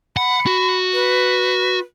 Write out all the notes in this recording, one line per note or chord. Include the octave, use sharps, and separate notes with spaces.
F#5 B5
F#4
B4